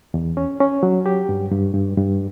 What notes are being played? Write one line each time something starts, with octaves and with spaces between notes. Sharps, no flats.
E2
C#4
C#4
F#3
G4
G2
G2
G2
G2